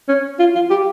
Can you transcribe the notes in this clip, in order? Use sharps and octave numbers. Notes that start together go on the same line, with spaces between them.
C#4
F4
F4
G4